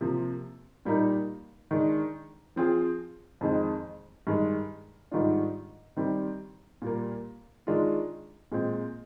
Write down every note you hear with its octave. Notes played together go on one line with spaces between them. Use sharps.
C3 F3 A#3
A#2 G3 A#3 D#4
D#3 G#3 D4
F3 C4 F4 G#4
F2 D#3 G#3 C4
G2 D#3 G#3
G#2 D#3 G3 D4 F4
D#3 G3 C4
A#2 G3 A#3
D#3 G#3 D4 F4
A#2 G#3 C4